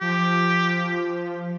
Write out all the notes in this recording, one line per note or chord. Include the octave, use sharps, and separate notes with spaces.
F3 G4